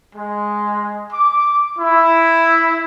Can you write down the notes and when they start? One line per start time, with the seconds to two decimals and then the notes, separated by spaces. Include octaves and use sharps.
0.13 G#3
1.12 D6
1.78 E4